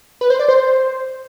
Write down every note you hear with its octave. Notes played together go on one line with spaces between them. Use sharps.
B4
C5
D5
C5